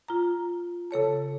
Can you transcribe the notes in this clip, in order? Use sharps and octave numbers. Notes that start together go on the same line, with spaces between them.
F4 A#5
C#3 A4 C#5 A5